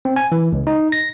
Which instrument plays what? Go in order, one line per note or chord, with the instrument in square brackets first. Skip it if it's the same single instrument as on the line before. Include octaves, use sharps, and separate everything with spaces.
[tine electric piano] C4
G#5
E3
C#2
D#4
A#6